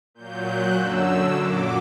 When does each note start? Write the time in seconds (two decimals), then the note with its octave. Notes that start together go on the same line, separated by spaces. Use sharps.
0.14 A#2 F#3 G6
0.44 F#6
0.75 F#2 D3 F#3 E6
1.35 A#2 F#3 D6